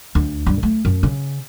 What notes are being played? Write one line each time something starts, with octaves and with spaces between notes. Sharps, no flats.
D2
G2
A3
F#2
C#3